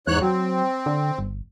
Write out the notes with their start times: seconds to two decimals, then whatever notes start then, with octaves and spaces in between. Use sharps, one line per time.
0.07 E2 G#2 C#5 F#6
0.21 F#3 C4
0.86 D3
1.18 G1